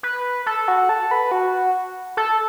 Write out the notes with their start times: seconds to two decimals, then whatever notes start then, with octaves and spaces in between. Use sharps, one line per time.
0.03 B4
0.46 A4
0.68 F#4
0.89 A4
1.11 B4
1.31 F#4
2.17 A4